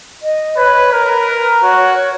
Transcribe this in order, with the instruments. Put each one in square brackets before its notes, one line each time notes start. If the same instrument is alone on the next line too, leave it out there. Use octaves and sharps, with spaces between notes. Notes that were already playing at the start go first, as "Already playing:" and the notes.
[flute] D#5
[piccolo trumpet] B4 [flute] C#5
[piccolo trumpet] A#4 [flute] B4
[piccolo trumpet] F#4 [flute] C#5